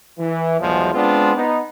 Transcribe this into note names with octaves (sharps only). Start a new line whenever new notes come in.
E3
B1 E2 F3 F#3 G#3
G#3 B3 C4 D4 F4
B3 D#4